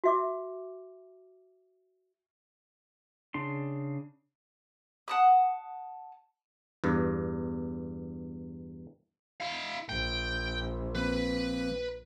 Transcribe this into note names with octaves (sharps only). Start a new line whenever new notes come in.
F#4 E5 D6
C#3 D4 C6
F#5 A5 D#6
E2 G2
E4 F5
A#1 G5
F3 A#3 C4 B4